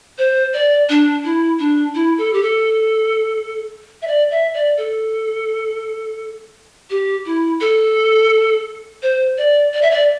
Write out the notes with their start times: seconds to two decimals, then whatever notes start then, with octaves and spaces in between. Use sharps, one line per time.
0.18 C5
0.54 D5
0.89 D4
1.24 E4
1.59 D4
1.95 E4
2.18 A4
2.33 G4
2.42 A4
4.02 E5
4.07 D5
4.31 E5
4.54 D5
4.78 A4
6.90 G4
7.26 E4
7.61 A4
9.03 C5
9.38 D5
9.74 D5
9.82 E5
9.91 D5